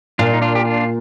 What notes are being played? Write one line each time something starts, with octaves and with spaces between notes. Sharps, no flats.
A#2 D4 F4
D#4
D4 F4
G4
D4 F4